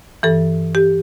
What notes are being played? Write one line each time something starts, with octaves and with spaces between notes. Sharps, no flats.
G2 E3 A4
G4